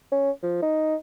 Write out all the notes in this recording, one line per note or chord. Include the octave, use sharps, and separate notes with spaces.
C#4
F3
D#4